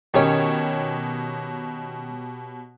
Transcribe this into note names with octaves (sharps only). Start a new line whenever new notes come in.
B2 D#3 C#4 G4 C#5